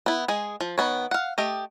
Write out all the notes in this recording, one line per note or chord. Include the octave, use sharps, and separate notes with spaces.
B3 E4
G#3 G#4
F3
D#3 B3 C#5
F5 F#5
A3 G4 D#5